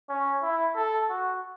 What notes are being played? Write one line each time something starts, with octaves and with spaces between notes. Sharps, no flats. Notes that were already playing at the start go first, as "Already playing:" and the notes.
C#4
E4
A4
F#4